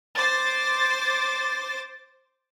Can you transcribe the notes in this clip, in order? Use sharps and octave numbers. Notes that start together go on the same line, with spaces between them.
C5 D6 A6